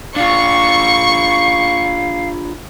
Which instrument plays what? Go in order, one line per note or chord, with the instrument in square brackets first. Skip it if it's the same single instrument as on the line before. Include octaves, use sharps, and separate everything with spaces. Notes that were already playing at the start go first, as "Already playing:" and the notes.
[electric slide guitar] D4 F4 [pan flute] F5 [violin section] C#6